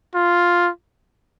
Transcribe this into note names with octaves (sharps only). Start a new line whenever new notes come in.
F4